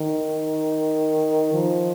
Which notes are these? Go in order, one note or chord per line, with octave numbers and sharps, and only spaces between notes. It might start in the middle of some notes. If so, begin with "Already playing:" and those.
Already playing: D#3
F3